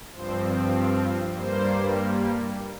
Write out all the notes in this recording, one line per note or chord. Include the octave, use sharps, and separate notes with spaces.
G2 F3 C4 C5
F5
C5
G2 G3 A#3 C5